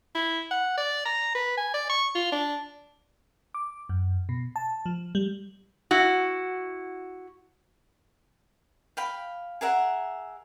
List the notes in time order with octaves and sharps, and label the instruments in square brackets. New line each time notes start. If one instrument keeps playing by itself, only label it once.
[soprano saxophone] E4
F#5
D5
A#5
B4
G#5
D5
C#6
F4
D4
[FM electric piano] D6
F#2
B2
A5
F3
G3
[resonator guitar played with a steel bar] E4 F#4
[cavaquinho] F5 G5 B5
G#4 A#4 E5 F#5